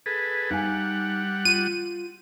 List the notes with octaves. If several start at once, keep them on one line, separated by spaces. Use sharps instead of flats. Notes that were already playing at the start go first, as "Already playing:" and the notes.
G#4 A4 B4
G3 D#4 F5 F#5 G#5
F4 D#7